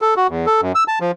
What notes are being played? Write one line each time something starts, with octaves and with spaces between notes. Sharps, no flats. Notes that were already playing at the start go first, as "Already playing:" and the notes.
A4
F#4
E2
A4
F#2
E6
A5
F3